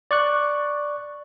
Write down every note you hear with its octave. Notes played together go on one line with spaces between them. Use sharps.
D5 C#6 F#6